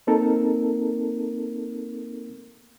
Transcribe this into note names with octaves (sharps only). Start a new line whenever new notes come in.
A#3 C4 D#4 A4 A#4